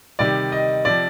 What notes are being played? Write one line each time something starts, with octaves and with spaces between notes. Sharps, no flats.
C3 D#3 G3 D5
D#5
C3 F3 D5